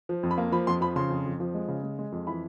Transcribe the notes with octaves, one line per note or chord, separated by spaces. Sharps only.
F3
F2
B5
A#3
F3 B5
F2 C6
F3 B5
C#3 C6
F2
F2
F3
G#3
C#3
G#3
G#3
F2
E3 B5